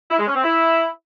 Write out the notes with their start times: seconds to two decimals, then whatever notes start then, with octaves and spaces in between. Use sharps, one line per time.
0.11 E4
0.19 G#3
0.28 C#4
0.36 C4
0.44 E4